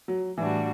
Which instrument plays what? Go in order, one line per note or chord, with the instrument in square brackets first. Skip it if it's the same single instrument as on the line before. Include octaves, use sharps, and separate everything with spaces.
[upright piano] F#3
[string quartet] A2 G3 D4 F#4 [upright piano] E3